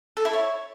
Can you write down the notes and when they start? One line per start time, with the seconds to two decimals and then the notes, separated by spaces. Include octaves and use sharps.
0.17 A4
0.25 E4
0.33 C#5